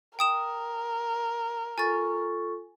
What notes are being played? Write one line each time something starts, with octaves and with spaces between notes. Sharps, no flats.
A#4 G5 D#6 E7
F4 A4 G#5 C#6 A6